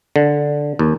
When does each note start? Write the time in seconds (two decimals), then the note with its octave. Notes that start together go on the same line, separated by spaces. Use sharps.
0.16 D3
0.79 D#2